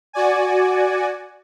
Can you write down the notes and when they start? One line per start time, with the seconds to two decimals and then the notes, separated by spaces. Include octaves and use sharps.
0.13 F#4 D5 G#5